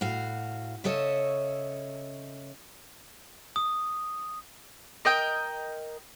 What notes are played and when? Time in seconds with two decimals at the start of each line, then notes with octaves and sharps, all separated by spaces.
0.01 A2 F#4 F5
0.84 C#3 C#4 A4 C#5 D#5 E5
3.56 D#6
5.05 A#4 D#5 G5